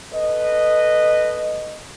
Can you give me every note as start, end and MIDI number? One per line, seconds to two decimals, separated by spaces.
0.13 1.85 69
0.13 1.85 71
0.13 1.85 75